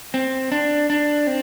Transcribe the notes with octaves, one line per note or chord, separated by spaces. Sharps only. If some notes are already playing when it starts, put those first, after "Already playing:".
C4
D4
D4
C4